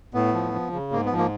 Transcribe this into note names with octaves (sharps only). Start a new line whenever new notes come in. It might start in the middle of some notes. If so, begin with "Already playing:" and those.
A2 B3
F3
F3
C#3
G#2 A#3
B3
F3
A#3